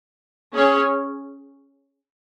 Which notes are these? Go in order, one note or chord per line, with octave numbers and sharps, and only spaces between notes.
C#4 G#4 C#5